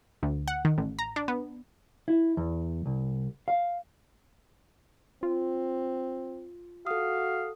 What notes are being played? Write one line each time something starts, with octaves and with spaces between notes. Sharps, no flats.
D2
F#5
D#3
A1
A#5
D4
B3
E4
E2
C2
F5
C4 F4
F#4 A4 F5 D#6